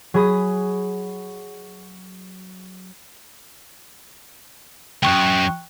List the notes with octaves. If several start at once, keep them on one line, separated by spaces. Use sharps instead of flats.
F#3 G#4 B5 D#6
C#2 F#2 G5 C#6 F#6